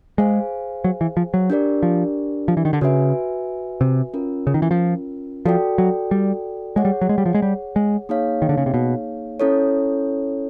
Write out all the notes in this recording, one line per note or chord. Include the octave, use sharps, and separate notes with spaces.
G#3 G#4 C5 F5 G#5
F#3
E3
F3
F#3
D4 G4 A#4 D5
F3
F3
E3
D#3
D3
C#3 F#4 B4 E5 G#5
C3
C#4 F4 A#4
C#3
D#3
E3
F3
F3 F#4 A4 D5 G5
F#3
G3
G#3 G#4 C#5 F#5
G3
F#3
G#3
G3
F3
G#3
G3
G#3
A#3 D#4 G#4 C#5 F5
D#3
D3
C#3
C3
B2
C#4 E4 A4 C#5